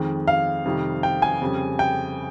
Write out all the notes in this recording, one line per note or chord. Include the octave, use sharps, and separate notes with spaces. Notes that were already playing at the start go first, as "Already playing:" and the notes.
Already playing: F2 D#3 G#3
F5
F2 C3 D#3 G3
G5
G#5
F2 C#3 G3
G5